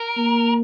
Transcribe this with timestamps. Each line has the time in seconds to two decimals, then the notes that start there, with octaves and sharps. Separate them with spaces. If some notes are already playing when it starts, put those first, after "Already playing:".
Already playing: A#4
0.17 A#3